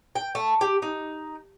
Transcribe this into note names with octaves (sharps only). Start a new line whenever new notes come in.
G5
A3
G4
D#4